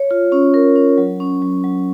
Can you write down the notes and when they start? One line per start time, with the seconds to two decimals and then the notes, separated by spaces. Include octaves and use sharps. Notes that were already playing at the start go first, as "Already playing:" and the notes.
Already playing: C#5
0.11 F4
0.32 C#4
0.54 A#4
0.76 C#4
0.98 F#3
1.20 C#4
1.42 F#3
1.64 F#3